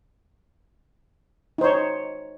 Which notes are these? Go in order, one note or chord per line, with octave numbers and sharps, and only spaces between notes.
D#4 C5 C#5